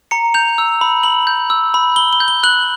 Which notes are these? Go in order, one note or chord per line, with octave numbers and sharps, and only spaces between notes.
A#5 C#7
G6 F7
E6
B5
B5 F#7
G6
E6
B5
B5 G7
G7
G6
G7
F#6 F#7